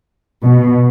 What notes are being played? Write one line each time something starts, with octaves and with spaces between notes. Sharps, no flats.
B2